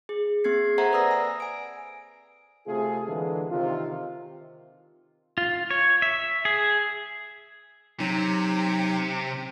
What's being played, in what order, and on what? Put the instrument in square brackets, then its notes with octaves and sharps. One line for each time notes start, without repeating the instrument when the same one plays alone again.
[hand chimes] G#4
A#3 C4 G#4 G#6 C7
A4 C5 E5 F#5 A#5 G#6
B4 D5 D#6 E6 A#6
G#5
G#5 D7
[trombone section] C3 A3 F4 G#4
D3 E3 G#3 A#3 A4
C3 D#3 F4
[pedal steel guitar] F4
C#5
E5
G#4
[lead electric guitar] C3 [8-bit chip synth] F#3 D#4